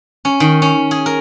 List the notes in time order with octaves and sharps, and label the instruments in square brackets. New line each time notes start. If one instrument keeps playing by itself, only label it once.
[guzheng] C#4
D#3
C#4
G#4
A#4